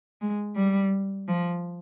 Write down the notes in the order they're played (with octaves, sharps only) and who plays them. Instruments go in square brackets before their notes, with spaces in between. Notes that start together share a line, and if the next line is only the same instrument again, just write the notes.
[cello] G#3
G3
F3